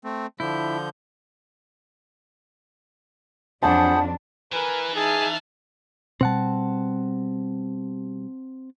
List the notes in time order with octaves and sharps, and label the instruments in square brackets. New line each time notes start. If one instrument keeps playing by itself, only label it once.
[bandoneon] A3 C4
[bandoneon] D3 F3 G6 [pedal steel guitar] E4
[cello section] F2 F#3 D4 [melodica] G#4 C5 B5 [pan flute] F#5 [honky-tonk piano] A5
[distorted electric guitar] E3 [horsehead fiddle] A#4 G#5 [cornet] B4
[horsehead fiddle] D#4 E5 [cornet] G#4 [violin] A5 F6
[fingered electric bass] B2 G3 [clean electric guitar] C4 F#5 A5